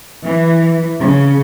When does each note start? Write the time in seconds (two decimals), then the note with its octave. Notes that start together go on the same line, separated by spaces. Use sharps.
0.24 E3
1.01 C#3